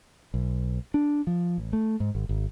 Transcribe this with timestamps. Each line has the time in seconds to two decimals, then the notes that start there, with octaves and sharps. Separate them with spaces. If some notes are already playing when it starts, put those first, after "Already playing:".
0.34 B1
0.94 D4
1.27 F3
1.58 A1
1.73 A3
2.00 G#2
2.15 G#1
2.29 G#1